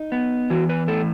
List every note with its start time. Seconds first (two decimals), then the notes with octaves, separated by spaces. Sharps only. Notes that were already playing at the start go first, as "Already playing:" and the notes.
Already playing: D#4
0.12 B3
0.50 E3 F#4
0.69 B4
0.88 A2 A4